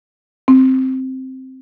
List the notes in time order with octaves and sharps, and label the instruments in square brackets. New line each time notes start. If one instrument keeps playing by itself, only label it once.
[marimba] C4